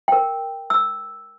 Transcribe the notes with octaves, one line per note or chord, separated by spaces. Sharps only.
A#4 G5
E6